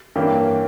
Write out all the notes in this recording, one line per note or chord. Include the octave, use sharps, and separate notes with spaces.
G2 E3 A#3 C#4 G4